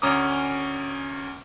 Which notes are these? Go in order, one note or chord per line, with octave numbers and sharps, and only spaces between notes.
D2 C#4 A#5 D6 D#6